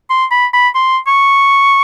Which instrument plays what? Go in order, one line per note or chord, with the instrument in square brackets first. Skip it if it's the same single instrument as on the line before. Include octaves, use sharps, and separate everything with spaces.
[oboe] C6
B5
B5
C6
C#6